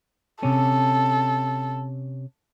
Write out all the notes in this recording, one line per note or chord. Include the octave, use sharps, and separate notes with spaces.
C3 C#4 A4